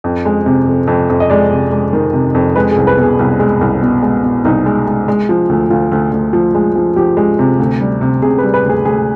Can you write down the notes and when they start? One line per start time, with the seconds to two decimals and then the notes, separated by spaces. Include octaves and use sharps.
0.04 F2
0.25 G#3
0.46 C3
0.67 F2
0.87 F2
1.09 F2
1.20 D#5
1.30 G#3 D5
1.51 C3
1.72 G#3
1.93 D#3
2.13 C3
2.35 F2
2.56 G#3 B4
2.71 G#4
2.77 C2
2.87 B4
2.98 B2
3.03 G#4
3.19 C2
3.40 G#3
3.61 C2
3.82 B2
4.02 G#3
4.24 B2
4.45 C2 D#4
4.66 G#3
4.87 G#3
5.08 G#3
5.29 F3
5.49 D2
5.70 D2 F4
5.92 D2
6.12 D2
6.33 F3
6.55 G#3
6.76 F3
6.96 F3 G4
7.17 G#3
7.39 C3
7.59 D2
7.81 G3
8.01 C3
8.22 C3 G#4
8.38 B4
8.44 G3
8.54 B4
8.64 D2
8.69 G#4
8.85 D2 G#4